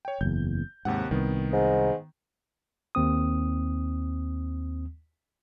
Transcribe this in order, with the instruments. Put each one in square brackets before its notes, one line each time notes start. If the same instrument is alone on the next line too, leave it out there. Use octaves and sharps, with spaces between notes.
[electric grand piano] C#5 G5
[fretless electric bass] F#1 E2 [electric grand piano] G6
[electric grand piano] D#2 C3 F#5 [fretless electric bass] G#2
[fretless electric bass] C2 [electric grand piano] D#3 B3
[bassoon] G#2
[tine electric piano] D#2 C4 D#6